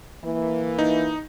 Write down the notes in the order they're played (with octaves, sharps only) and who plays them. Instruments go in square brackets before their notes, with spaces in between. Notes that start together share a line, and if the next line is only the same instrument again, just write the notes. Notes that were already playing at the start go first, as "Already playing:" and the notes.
[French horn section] E3 A#3
[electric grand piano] D#4